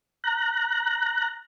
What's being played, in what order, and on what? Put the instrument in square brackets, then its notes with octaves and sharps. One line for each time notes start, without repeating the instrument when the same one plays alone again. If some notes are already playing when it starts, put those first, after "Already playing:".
[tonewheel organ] A#5 F#6